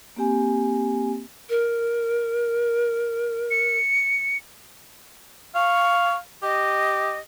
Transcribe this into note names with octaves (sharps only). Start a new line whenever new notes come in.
A#3 C4 G4 G#5
A#4
C#7
F5 C#6
G4 D#5